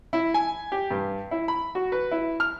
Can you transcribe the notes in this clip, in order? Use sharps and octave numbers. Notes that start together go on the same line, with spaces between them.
E4
G#5
G4
G2
E4
B5
F#4
B4
E4
F6